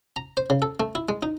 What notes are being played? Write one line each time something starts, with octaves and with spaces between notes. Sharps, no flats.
A#5
C5
C#3
A4
A3
E4
G#3
D#4